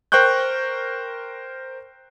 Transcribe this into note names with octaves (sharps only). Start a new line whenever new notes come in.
A#4 C5 G5 C#6 F#6 G6